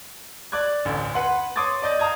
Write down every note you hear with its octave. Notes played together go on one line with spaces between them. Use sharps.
D5 D6 F#6 G#6
A1 D2
B4 F#5 C6
C#5 C6 D6 D#6 G#6 A6
D5 D#5 G6 A6
F5 A5 A#5 D#6 G#6